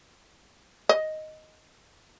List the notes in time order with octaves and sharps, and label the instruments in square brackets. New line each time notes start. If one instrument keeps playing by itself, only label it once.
[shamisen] D#5